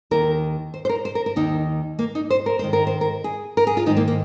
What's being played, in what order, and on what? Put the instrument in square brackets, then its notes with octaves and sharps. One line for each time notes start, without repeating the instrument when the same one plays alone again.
[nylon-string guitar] D#2 D#3 A#4
C5
C5
A#4
C5
A#4
A#4
D#2 D#3 D#4
A#3
D#4
C5
A#4
G#2 D#3 C5
A#4
C5
A#4
G#4
A#4
G#4
F4
D#3 D#4
G#2
A#3
A#3